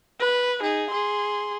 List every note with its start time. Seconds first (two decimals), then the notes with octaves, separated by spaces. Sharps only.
0.20 B4
0.61 D#4 G#4
0.90 G#4 C6